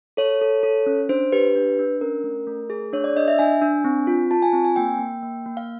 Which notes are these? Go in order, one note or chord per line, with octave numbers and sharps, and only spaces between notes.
A4 C#5
A4
A4
C#4
D4 C5
G4 B4
D4
D4
C#4 A#4
A3
A3
G#4
D4 C#5
D5
D4 D#5
E5
D4 G#5
D4
C4
F4
F4 A5
G#5
C4
G#5
A#3 G5
A#3
A#3
A#3
F5